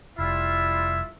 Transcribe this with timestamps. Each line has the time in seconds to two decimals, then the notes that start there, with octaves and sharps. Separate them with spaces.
0.18 F1 G3 E4 F4 E5